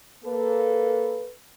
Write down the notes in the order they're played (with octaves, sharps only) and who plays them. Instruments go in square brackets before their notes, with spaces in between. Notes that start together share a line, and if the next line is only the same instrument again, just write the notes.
[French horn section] A#3 A4 B4